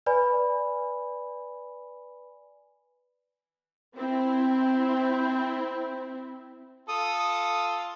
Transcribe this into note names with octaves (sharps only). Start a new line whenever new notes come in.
B4 D5 G#5 B5
C4 E4
F4 A4 D#6